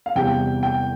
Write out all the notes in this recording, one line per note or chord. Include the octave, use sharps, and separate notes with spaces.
F5
E2 C3 G3 G5
G5